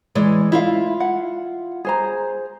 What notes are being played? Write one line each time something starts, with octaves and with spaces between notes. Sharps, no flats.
E3 G#3 D5
E4 F4 E5 F5
F#5
G#4 C5 A#5